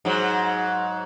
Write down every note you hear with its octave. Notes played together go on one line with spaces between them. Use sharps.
G#2 F#3